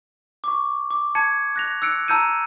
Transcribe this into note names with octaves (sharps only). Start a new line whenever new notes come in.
C#6 D6
D6
A5 G#6 C#7
F#6 A#6 F7
E6 F#6 C#7 D7
A5 A#5 E6 G6 C#7 D#7